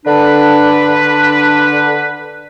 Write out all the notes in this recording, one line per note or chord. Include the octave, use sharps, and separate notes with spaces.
D3 D4 B4